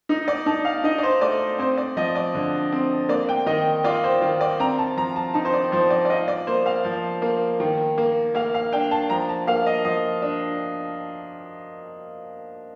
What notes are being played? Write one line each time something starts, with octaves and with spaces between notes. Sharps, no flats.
D#4
D5
D#4 A5
F5
D#4 D#5
D5
C5
A3 D5
C4 C5
D5
F3 D#5
D5
D3
C4
A#3 D5
G5
D#3 D#5
F4 D5
C5
D#3
D5
C4 A#5
A5
F3 A#5
A5
D#4 A5
C5
D5
F3 C5
D5
D5
F4 D#5
D5
A#3 C5
F5
F3
A#3
D#3
A#3
A#3 F5
F5
D4 G5
A5
F3 A#5
A5
A#3 F5
D#5
F3 D#5
D4